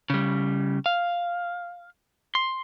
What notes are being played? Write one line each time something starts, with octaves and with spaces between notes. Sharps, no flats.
C#3 G3
F5
C6